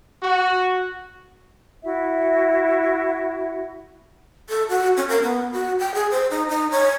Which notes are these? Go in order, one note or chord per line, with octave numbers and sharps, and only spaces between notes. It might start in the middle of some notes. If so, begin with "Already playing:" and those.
F#4
E4 F#4 E5
A4
F#4
C#4
A#4
B3
F#4
G5
G#4
C5
D#4
D#4
C#5